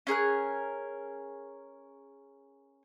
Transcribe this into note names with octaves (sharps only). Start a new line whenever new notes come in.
C#4 G#4 A#4 F#6